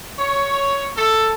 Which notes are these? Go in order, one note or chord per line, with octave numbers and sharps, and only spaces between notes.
C#5
A4